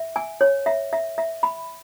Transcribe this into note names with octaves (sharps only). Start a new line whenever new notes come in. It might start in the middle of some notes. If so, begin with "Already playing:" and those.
Already playing: E5
G#5
C#5
E5
E5
E5
B5